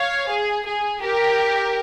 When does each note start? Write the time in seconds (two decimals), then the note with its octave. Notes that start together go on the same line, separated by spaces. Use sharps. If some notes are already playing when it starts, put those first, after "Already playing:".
Already playing: C#5 F5
0.29 G#4
0.66 G#4
1.02 G4 A#4